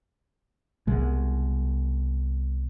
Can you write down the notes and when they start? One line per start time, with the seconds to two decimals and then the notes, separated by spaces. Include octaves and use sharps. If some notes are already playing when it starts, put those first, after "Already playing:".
0.87 C2 B2 G#3